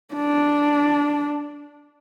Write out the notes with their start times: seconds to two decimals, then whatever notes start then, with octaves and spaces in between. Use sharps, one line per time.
0.15 D4